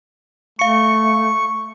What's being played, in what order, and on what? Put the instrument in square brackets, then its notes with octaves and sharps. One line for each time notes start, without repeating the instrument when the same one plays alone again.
[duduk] A3 [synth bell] F5 C#7 [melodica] C#6